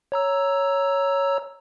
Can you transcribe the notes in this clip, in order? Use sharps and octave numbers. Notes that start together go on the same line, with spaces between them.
C#5 A#5 E6